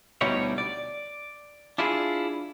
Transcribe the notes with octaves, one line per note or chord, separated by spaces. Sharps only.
D2 B2 G3 D#4 E4 C#5
D5
D4 E4 F4 G#4